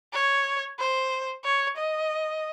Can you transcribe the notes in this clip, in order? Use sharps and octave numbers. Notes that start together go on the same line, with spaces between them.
C#5
C5
C#5
D#5